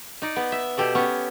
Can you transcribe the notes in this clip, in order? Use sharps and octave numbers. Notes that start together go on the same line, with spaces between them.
D#4 D5
B3
E5
B2 G4 A4 D5
B3 C#4 C#5